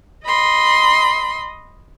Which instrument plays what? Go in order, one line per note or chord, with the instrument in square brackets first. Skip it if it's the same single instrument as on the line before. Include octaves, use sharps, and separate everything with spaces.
[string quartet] D#5 B5 C6